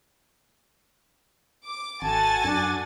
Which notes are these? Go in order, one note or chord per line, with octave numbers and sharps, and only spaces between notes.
D6
G#1 F#4 A4 F#5 G#5 A5 A6
F#2 D4